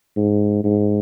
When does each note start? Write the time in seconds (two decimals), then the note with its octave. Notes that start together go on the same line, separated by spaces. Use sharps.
0.17 G#2
0.64 G#2